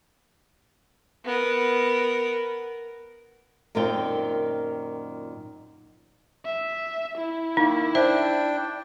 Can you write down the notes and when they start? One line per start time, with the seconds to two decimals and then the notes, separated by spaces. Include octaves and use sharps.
1.25 B3 A#4
3.75 F#2 A#2 D#3 C4 F4 G5
6.45 E5
7.17 E4
7.57 D#3 A#3 D#4
7.95 D4 C5 E5 G5